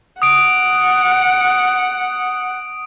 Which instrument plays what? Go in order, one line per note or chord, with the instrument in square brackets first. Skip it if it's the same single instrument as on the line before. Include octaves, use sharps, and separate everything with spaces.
[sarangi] F#5 [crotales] D#6 D7